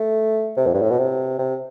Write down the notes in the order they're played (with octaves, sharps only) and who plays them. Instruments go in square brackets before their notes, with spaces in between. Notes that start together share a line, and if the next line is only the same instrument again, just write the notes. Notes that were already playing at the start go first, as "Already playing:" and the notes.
Already playing: [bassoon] A3
C3
F2
G2
A2
B2
C3
C3